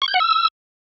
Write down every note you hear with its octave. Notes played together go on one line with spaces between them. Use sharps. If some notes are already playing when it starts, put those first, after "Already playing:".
C#6
G6
F#5
E6